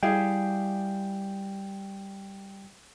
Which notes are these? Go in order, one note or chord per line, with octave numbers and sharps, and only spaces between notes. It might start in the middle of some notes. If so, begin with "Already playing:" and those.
G3 E4 G#4 F5 G5